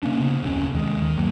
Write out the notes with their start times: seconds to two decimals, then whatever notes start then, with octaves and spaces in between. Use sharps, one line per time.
0.03 C3 A#3 C#4 D4
0.18 C#3 B3
0.43 D1 F2 C3 C#4
0.74 D#2 D#3 G#3
1.02 D#3
1.17 B1 G2 F#3 A#3